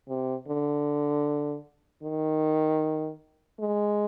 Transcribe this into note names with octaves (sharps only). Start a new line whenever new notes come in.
C3
D3
D#3
G#3